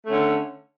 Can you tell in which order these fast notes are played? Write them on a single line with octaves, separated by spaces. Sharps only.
A3 C#4 D3